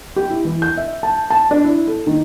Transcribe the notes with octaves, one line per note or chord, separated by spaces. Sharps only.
G4
E4
E3
G6
E5
A5
A5
D4
E4
A4
D#3